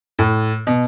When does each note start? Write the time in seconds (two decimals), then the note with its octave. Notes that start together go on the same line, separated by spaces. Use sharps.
0.19 A2
0.67 B2